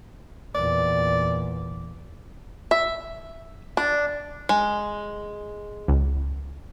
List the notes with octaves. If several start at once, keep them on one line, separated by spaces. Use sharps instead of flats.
E2 A#2 D5
E5
D4
G#3
C#2